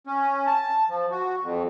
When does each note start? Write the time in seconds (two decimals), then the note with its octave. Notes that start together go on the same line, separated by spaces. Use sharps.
0.07 C#4
0.47 A5
0.90 F3
1.11 F#4
1.43 F2